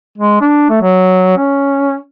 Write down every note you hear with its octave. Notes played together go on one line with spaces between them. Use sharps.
G#3
D4
A3
F#3
C#4